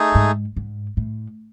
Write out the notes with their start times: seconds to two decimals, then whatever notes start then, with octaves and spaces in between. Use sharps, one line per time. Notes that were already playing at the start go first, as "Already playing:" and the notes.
Already playing: A3 D#4 G#4
0.15 G#2
0.57 G#2
0.97 A2